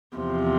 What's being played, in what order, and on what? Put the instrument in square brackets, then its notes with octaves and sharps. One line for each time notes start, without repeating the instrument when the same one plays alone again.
[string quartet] E2 C3 F3